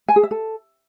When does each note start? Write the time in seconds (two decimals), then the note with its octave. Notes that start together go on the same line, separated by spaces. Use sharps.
0.09 G#5
0.16 G#4
0.23 E5
0.31 A4